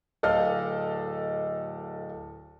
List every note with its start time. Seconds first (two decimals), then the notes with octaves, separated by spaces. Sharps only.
0.23 D1 A4 D5 D#5 F5 F6